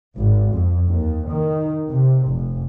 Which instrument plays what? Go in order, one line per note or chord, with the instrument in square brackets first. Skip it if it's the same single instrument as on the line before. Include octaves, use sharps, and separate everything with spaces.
[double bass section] G#1
F2
D#2
D#3
C3
F1